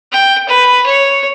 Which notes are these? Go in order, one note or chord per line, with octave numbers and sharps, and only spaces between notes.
G5
B4
C#5